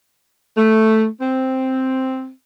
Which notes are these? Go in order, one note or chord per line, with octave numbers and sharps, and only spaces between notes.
A3
C4